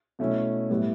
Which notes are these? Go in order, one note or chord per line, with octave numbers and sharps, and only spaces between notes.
B2 A3 C#4 E4
A2 G3 B3 E4